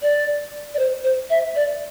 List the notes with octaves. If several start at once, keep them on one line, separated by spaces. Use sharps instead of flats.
D5
D5
C5
C5
E5
D5